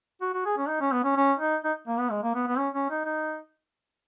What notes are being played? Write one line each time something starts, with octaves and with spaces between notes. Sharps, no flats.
F#4
F#4
G#4
C#4
D#4
C#4
B3
C#4
C#4
D#4
D#4
A#3
B3
G#3
A#3
B3
B3
C#4
C#4
D#4
D#4